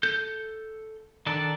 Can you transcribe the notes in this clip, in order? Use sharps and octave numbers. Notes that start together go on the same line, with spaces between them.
A4 G6
D#3 D4 A4 D5 A5